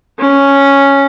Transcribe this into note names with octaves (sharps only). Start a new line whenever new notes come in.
C#4